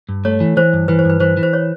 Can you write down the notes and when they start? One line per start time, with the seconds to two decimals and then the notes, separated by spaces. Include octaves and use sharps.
0.09 G2
0.25 A3 C#5
0.40 E3
0.57 E3 C5
0.73 G2
0.88 E3 B4
0.99 C5
1.05 G2 B4
1.20 E3 C5
1.37 E3
1.43 C5
1.53 C#5